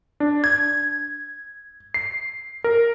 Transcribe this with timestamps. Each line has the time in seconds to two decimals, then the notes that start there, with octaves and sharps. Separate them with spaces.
0.20 D4
0.44 G#6
1.94 C7
2.64 A#4